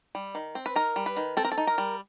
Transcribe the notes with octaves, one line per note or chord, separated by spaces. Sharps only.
G3
D#3
C4
B4
D#4 A#4
G3
B4
D#3
C4 A4
A#4
A4
D#4
A#4
G3